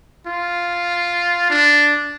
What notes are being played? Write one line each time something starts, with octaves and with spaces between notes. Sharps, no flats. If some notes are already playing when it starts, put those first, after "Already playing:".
F4
D4